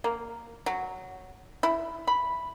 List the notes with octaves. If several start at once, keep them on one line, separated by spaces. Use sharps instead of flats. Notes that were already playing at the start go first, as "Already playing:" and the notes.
A#3
F#3
E4
B5